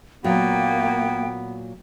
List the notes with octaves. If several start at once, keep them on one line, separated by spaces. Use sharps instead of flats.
A#2 F#3 A#3 B3 G5